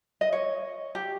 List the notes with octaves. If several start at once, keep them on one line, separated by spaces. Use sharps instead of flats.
D#5
C#5
G4